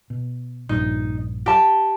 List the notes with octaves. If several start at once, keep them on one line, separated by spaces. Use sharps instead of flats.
B2
A#1 G2 D#4
G4 A5